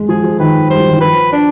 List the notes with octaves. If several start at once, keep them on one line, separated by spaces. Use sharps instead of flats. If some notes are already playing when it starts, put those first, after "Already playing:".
Already playing: G#3
F3 G#4
F3
D#3 B4
G3 C5
F3
D#3
F3 B4
D4